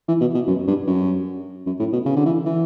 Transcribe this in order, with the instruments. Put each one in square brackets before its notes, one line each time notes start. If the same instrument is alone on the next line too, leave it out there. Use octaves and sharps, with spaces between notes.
[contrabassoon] E3
B2
B2
F#2
G2
F#2
F#2
A2
B2
C#3
D3
E3
E3